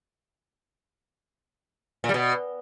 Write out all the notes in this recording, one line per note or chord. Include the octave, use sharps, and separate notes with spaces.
A#2
G3
B2